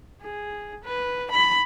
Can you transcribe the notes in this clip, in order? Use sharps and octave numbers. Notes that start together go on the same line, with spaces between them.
G#4
B4
B5